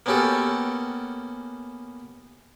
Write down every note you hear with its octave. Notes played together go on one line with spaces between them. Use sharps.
A#3 B3 C#4 F#4 G4 A4